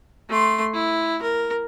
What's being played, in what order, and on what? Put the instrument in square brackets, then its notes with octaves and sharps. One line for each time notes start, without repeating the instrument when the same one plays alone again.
[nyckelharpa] A3 C6
E4
A#4